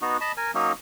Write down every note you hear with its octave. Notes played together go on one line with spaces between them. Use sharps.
B3 D#4 F#4
D#5 A5 B5
A#4 G#5
F#3 A#3 C#4 D#4